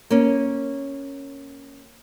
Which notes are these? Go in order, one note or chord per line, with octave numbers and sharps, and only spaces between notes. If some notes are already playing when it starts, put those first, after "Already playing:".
A#3 C#4